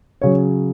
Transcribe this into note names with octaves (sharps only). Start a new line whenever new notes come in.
C#3 F#3 C#5